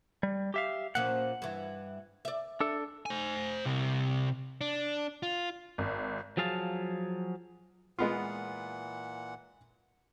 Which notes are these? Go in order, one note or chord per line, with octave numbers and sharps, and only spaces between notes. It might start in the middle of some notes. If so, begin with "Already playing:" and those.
G3
G4 E5 F5
A#2 F3 C#4 F#5
G2 E3
D5 E5
D4 A4
C5 G#5
C2 C3
D4
F4
G#1
F3 F#3 G#4 F5 A5
A#2 E3 G#3 B3 F4 F#5